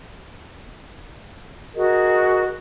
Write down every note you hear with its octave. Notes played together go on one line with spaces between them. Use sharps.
F#4 G#4 A#4 D#5